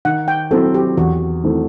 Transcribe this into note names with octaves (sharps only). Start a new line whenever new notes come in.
D#3 F#5
G5
F#3 C4 E4 A4
G4
E2 F#4
D#3 A3 C4 E4